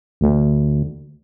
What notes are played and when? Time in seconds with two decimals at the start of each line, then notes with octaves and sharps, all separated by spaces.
0.21 D2